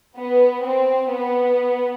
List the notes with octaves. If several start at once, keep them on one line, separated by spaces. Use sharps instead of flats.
B3
C4
B3